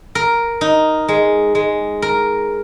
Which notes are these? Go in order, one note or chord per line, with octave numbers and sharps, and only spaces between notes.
A#4
D#4
G#3
G#3
A#4